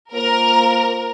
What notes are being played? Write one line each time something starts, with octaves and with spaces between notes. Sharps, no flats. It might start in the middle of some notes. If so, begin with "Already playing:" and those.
A#3 F4 A#4 C5